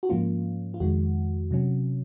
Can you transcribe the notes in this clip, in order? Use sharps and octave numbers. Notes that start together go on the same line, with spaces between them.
F#4
G#2 F3 A#3 C#4 F4
F4
F2 D#3 G#3 F#4
C3 F#3 C#4